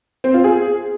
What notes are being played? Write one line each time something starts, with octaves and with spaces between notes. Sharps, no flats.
C4
F4
G#4